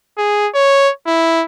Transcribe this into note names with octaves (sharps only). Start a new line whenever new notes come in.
G#4
C#5
E4